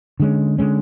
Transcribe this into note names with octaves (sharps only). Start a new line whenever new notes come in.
D3 G#3 C#4
D3 G#3 C#4